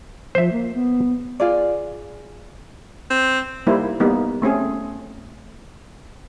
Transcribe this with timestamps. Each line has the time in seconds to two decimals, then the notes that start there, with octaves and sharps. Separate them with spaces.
0.35 F3 C5 E5
0.52 A#3
0.74 B3
1.40 F4 G#4 D5
3.10 C4
3.67 G3 A#3 D#4 E4 C5
4.00 G3 A#3 B3 D#4
4.42 A3 C4 C#4 G#4